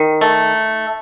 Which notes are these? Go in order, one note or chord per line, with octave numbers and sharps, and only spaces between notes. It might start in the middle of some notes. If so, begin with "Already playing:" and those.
Already playing: D#3
A3